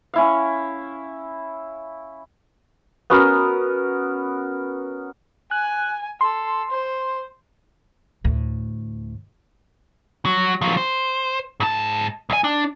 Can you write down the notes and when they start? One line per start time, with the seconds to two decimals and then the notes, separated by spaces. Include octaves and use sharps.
0.14 C#4 E4 F5
3.10 B3 C#4 F#4 A#4
5.51 G#5 F#6
6.21 A4 C6
6.71 C5
8.24 D2 A2
10.26 F#3
10.62 F3 F#3
10.77 C5
11.60 G#2 A5
12.30 C2 G#5
12.44 D4